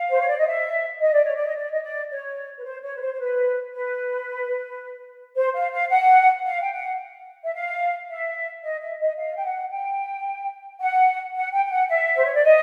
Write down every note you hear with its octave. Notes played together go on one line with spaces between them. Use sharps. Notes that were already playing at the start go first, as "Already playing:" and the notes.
Already playing: F5
C5
C#5
D5
D#5
E5
D#5
D5
C#5
D5
D#5
D5
D#5
D5
C#5
B4
C5
C#5
B4
C5
C5
B4
B4
C5
F5
F5
F#5
F5
G5
F#5
E5
F5
E5
D#5
E5
D#5
F5
G5
F#5
G5
F#5
F#5
G5
G5
F#5
E5
C5
C#5
D5
D#5